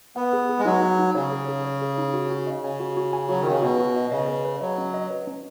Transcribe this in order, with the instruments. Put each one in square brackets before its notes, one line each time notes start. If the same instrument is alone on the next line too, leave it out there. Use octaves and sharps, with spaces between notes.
[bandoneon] B3 [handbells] F#5
[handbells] G#4
G#4
[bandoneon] G#3
[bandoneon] F#3 [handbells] D#4
[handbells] F#5
D#4
[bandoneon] C#3 [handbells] C#5
[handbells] G#4
G#4
C#5
G#4
D#4
F#4
F#4
D#5
[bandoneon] C#3 [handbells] G#5
[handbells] F#4
F#4
G#5
[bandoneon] F#3 [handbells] F#4
[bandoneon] D#3
[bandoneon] C#3 [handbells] F#4
[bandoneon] B2 [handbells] F#4
[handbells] F#4
D#5
[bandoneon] C#3 [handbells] D#5
[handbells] B4
B4
[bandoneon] F#3 [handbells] D#5
[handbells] C#4
D#5
B4
C#4